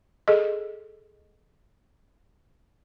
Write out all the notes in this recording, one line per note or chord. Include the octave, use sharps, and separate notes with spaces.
G#4 A4 D#5